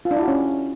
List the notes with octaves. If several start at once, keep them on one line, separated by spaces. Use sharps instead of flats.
F4
D4
E4
F#4
C#4